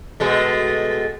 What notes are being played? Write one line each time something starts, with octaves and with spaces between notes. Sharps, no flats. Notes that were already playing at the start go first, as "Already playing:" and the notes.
B2 G#3 A3